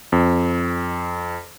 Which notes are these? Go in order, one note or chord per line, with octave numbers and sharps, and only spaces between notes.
F2